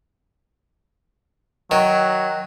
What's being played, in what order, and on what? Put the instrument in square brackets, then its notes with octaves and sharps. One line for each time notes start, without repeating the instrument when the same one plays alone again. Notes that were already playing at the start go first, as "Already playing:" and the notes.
[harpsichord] D#3 [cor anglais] F#3